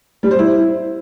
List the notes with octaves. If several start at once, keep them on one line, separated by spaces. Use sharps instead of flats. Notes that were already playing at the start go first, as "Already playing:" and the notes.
G3
C5
E4